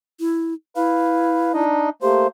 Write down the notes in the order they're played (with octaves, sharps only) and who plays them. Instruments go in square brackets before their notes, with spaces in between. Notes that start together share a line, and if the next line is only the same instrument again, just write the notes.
[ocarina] E4
[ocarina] E4 [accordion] B4 F5
[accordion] D4 D#4 D#5
[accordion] A3 A#3 C5 [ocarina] G4